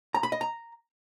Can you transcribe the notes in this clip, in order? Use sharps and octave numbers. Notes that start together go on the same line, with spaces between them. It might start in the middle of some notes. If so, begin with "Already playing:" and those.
A#5
B5
D#5
A#5